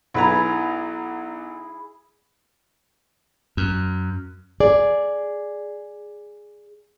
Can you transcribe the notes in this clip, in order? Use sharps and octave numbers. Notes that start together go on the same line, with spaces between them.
B1 E4 G#4 B4 A#5
F#2
G#4 D5